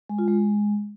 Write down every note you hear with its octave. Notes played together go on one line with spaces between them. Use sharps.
G#3
F4
G#3